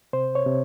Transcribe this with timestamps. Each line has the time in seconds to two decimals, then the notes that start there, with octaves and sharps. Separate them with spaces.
0.13 C3 C5
0.35 C#5
0.46 C3